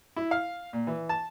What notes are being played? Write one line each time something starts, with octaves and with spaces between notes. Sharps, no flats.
E4
F5
A#2
E3
A5